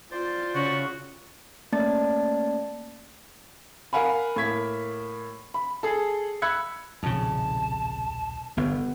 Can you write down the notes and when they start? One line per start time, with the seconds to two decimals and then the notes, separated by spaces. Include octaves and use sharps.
0.12 F4 C5 D5
0.55 C#3 F#4
1.72 A3 A#3 C#4 D5 A5 A6
3.93 A#4 F5 F#5 G#5 B5
4.36 A2 A#3 G#6 B6
5.54 B5
5.83 G#4 A4
6.42 B5 E6 F#6 G#6 C#7
7.03 D#1 B1 F2 C#3 A5
8.57 G1 B3